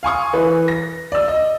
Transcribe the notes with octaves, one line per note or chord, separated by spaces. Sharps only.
F5 G#5 C#6 D#6
E3 B4
A#6
D5 E6
D#5